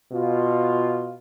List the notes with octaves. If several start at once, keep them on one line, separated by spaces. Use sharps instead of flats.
B2 F4